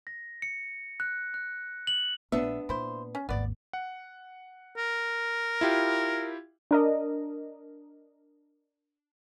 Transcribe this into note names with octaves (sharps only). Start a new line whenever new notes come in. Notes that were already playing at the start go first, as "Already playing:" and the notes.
A#6
C#7
F#6
F#6
F#7
A#1 B3 D4 E5
A#2 E4 C5
C#4
G#1 D#2 B3 D5
F#5
A#4
E4 F4 G4
D4 A#4 D#5